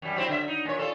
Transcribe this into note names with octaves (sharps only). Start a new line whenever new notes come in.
F#2 G3
F#3 C4 E4
D3 E5
D#4
A#2 C#5
F4 A4